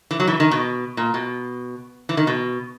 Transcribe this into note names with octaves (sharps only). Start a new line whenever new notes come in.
E3
F#3
E3
D#3
B2
A#2
B2
E3
D#3
B2